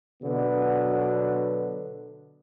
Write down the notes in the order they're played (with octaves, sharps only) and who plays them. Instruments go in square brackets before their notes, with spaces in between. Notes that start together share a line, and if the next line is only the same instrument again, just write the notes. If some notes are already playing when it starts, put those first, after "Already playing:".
[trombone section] B2 D3 F#3 B3